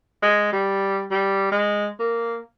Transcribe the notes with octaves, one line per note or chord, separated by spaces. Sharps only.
G#3
G3
G3
G#3
A#3